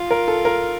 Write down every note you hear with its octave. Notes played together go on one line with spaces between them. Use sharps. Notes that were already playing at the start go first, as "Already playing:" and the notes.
Already playing: F4
A#4
A4
A#4